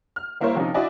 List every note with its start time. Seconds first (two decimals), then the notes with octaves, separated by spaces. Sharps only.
0.16 F6
0.40 G3 A#3 E4 A#4 C5 C#5
0.55 C3 F3 C#4 D#4
0.74 D4 E4 F#4 D5 D#5 G#5